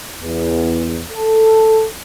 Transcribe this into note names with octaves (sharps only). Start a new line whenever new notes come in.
E2
A4